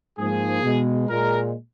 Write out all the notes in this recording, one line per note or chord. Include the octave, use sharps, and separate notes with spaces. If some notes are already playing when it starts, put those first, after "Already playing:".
G#2 F3 A#3 G#4
B2 G#3
A#2 G#3 A#4